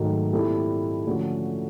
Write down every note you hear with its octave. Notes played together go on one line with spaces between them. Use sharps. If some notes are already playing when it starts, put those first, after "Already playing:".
Already playing: G#2 D#3 F#3 A3
A#2 G3 C4 E4 A4
D3 F3 A3 C#4 F#4